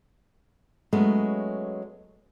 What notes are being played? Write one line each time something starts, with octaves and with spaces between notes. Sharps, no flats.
F#3 G#3 A3 B3 C#4